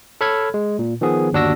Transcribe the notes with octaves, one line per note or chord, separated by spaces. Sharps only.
A4 C#5 B5 F6 G#6
G#3
A#2
D#3 F3 B3 G#4
G1 D#2 D4 F#4 E6 A#6